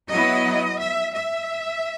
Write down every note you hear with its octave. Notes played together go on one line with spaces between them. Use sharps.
F#3 B3 E4 D#5
E5
E5